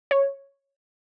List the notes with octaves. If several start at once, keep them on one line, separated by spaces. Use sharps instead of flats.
C#5